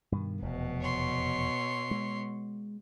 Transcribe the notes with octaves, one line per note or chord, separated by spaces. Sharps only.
G2 B2 D#3
F1 E2 B2
C#5 C6
G#3